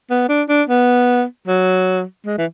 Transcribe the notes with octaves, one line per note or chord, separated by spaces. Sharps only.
B3
D4
D4
B3
F#3
G#3
E3